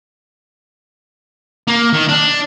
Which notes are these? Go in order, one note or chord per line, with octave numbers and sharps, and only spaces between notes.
A#3
D#3
D4